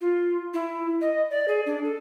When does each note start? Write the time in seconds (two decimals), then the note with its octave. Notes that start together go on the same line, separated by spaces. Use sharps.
0.01 F4
0.54 E4
1.01 D#5
1.30 D5
1.48 G#4
1.66 D4
1.84 A4